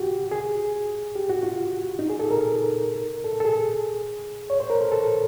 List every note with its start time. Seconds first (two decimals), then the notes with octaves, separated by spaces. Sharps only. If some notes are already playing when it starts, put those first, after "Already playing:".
Already playing: F#4 G4
0.31 G#4
1.15 G4
1.30 F#4
1.43 F4
1.99 D#4
2.10 G#4
2.20 A4
2.31 A#4
3.24 A4
3.40 A4
3.45 G#4
4.50 C#5
4.60 C5
4.70 A#4
4.81 A4
4.92 A4